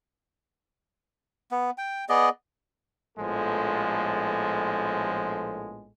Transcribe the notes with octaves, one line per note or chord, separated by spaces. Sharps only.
B3
G5
B3 G#4 D5 D#5
A#1 A2 F3 G#3 B3 A4